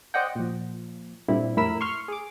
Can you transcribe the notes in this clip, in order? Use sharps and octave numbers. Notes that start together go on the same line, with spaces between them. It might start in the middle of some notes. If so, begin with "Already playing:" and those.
C5 D5 D#5 F#5 G5
A#2 F3
G2 A#2 D3 G3 C4 E4
F2 A2 E4 A#4 B5 E6
C6 C#6 F6
G#4 D6